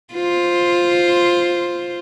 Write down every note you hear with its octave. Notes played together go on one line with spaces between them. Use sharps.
F4 C5